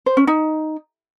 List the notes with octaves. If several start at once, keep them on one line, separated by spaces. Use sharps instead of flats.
C5
C#4
D#4